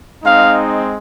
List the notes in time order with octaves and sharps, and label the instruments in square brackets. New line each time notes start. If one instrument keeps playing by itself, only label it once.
[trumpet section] G#3 C4 D#4 F5